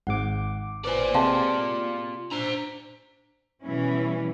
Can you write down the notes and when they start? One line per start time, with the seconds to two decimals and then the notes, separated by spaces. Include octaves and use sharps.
0.07 G#1 G#2 F#5 D6
0.85 F4 B4 C5 D5 G#5
1.14 C3 G#3 F5 G5 A5 C6
2.31 D4 C5 A#5
3.62 B2 E3 G3 C#4 E4